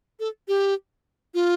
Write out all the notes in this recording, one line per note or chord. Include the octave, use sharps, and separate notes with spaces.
A4
G4
F4